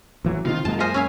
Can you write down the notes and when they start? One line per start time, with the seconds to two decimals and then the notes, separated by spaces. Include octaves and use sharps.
0.25 A1 E3 F#3
0.46 C3 D#3 F4
0.65 F#2 G#3 A#3 A5
0.80 F4 C5 D#5 G#5
0.94 C#4 E4 F5